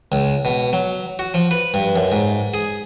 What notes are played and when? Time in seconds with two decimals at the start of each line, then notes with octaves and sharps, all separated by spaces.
0.12 C#2
0.45 B2
0.73 F#3
1.19 F#4
1.34 F3
1.51 B4
1.74 G2
1.96 F#2
2.12 G#2
2.54 G#4